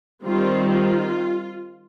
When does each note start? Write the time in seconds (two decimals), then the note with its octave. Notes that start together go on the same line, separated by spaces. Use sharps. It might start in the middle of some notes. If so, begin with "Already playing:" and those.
0.24 D#3 G3 C4 F4
0.69 F4